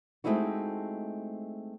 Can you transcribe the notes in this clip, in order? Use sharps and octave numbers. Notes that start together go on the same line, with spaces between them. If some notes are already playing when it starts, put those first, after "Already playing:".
G#3 A3 C4 D#4 E4 F#4